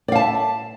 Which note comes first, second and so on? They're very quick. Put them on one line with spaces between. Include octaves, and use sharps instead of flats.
D5 F5 A5 E5